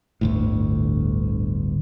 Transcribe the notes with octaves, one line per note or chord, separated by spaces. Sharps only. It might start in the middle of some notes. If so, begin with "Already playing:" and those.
G1 D2 A2